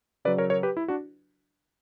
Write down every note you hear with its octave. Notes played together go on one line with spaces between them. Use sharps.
C#3 F#3 B4 D5
A#4 C#5
A#4 C#5
G4 B4
E4
D4 F#4